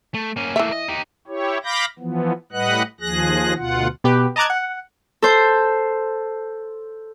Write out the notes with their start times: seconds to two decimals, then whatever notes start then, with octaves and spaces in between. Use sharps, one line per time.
0.14 A3
0.36 A#3 C#4
0.56 E3 A3 A#3 E5
0.72 D#5
0.88 D#4 G4
1.27 E4 G4 C#5
1.64 F5 B5 D6 G6 A#6
1.99 E3 F3 B3
2.52 A2 G3 B4 D#5 F#5 F#6
3.01 D#2 F3 G#4 F#6 A#6
3.57 D2 B2 F4 F#5
4.04 B2 G4 B4
4.36 D#5 A5 A#5 D6 F#6 G#6
4.50 F#5
5.22 A4 C5 C6